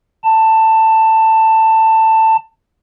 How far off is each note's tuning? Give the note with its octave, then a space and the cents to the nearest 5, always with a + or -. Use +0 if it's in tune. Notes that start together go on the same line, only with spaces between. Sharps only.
A5 +15